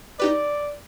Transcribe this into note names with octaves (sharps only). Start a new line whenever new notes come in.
D#4 G4 B4 D5